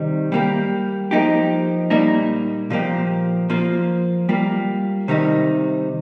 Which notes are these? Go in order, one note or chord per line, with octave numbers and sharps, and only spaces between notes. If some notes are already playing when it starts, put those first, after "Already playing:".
Already playing: C3 D#3 G3 D#4
G3 A#3 G4
F3 A#3 D#4 G4
A#2 G3 A#3 D#4
A#2 F3 A#3 G4
F3 A#3 F4
G3 A#3 F4
C3 D#3 G3 D#4